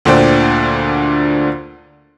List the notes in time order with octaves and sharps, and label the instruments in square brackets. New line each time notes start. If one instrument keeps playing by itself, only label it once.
[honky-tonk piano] D2 A#2 D3 D4 C5 G5